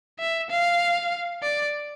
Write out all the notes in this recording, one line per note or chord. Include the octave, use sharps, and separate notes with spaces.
E5
F5
D5